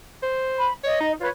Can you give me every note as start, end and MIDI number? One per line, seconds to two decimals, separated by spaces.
0.23 0.67 72
0.57 0.74 83
0.84 0.96 73
0.84 1.11 75
1.00 1.14 63
1.21 1.29 65
1.21 1.29 71
1.21 1.29 73